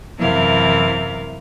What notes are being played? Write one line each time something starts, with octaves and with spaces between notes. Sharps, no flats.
F#2 C3 E3 E4 A#4 F5